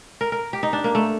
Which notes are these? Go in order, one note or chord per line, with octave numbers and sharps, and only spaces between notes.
A#4
A#4
G4
D#4
D4
A#3
A3